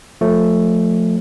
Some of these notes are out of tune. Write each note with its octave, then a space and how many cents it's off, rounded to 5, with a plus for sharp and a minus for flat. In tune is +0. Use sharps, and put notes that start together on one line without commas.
F3 +30 A3 +10